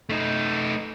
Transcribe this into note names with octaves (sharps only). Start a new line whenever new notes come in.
A3 D#4